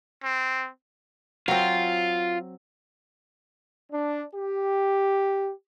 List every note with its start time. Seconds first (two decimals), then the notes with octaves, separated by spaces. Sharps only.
0.24 C4
1.48 F#3 C4 F4
3.93 D4
4.35 G4